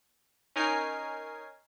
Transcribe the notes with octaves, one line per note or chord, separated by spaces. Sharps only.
C#4 D#4 A#4 G#5 C7